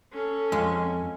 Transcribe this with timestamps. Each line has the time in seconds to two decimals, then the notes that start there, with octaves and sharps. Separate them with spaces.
0.13 C#4 A4
0.52 F2 G#3